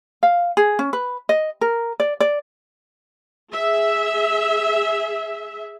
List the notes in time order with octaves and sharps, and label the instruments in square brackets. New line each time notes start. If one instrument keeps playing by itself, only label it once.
[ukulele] F5
G#4
C#4
B4
D#5
A#4
D5
D5
[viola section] G#4 E5